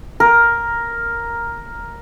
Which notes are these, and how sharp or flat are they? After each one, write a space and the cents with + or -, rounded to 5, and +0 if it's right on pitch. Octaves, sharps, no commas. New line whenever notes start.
A#4 +5